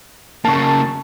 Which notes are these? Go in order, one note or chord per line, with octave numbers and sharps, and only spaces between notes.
C#3 A#3 A5 C#6